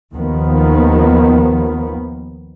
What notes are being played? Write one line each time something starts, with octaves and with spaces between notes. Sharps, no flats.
D#2 D#3 F3 B3